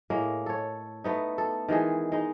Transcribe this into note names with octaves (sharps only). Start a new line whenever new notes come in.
A2 G#3 A#3
A4 C#5
A3 B3 D#4
A4
D#3 E3 G#3 G#4
G#3 D#4